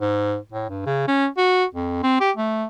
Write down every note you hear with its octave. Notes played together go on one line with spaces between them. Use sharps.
G#2
A2
G2
C#3
C#4
F#4
F2
C4
G4
A3